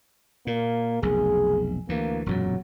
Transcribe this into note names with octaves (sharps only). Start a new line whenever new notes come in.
A#2 A#3
F1 B1 G#4
D2 E3 A#3
E1 F#2 A#2 F#3